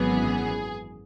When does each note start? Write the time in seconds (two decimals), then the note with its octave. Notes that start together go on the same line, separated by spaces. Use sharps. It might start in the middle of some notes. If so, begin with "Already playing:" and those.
Already playing: G#1 F#2 E3 B3 G#4